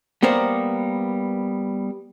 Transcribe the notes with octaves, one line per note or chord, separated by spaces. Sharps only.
G3 A#3 B3 A#4 C5 D5